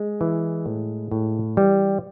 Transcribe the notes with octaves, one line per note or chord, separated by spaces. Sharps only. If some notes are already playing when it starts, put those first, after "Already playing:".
Already playing: G#3
E3
A2
A2
E3 G3